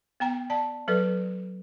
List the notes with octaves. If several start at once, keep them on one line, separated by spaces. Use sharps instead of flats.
B3 G5 A#5
D5 A5
F#3 A4 B4 D5